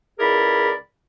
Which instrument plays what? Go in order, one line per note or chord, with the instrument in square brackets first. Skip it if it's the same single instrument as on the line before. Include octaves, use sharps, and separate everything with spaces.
[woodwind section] C#2 E4 G#4 A#4 D5 B5